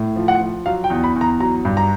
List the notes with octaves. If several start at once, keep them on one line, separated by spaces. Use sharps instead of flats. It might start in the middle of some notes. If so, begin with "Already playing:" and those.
Already playing: A2
F3
F#5
F3
F#3 F5
G5
E2
B5
E2
A#5
F#3 A#5
G2
A#5